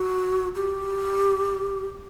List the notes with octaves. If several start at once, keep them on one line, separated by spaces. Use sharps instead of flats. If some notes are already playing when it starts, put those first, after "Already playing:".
Already playing: F#4
G4